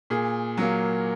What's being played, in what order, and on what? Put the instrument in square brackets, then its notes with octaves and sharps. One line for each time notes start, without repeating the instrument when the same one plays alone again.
[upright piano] A#2 G#4
F#3 A#3